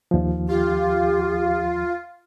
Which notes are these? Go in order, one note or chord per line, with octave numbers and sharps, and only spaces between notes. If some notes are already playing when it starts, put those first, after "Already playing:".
D#2 F3
F4 G4